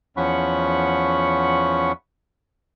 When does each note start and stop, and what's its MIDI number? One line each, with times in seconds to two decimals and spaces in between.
0.17 1.92 40
0.17 1.92 53
0.17 1.92 61
0.17 1.92 78
0.17 1.92 83
0.17 1.92 85